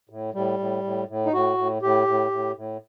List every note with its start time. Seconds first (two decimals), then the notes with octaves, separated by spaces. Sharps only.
0.09 A2
0.34 A2 G3
0.59 A2
0.84 A2
1.08 A2
1.26 D#4
1.33 A2 F#4
1.58 A2
1.82 A2 G4
2.07 A2
2.31 A2
2.56 A2